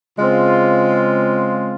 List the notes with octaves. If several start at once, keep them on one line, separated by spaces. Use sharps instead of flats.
C#3 G#3 C4 F4